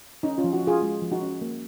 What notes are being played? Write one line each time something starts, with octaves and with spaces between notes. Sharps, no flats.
C#4 D#4
C#4 F4
F3
D#4 F#4
F3 F4 G#4
G#3
F3
D#4 F#4
C#4
A#3